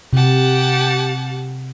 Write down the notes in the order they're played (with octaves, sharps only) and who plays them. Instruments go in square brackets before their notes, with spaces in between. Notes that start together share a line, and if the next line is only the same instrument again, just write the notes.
[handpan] C3 [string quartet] G4 F#5 A5